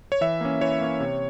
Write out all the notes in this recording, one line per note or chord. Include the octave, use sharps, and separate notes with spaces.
C#5
E3 E5
A#3 C#4
E3 C#5
A#3 C#4
C3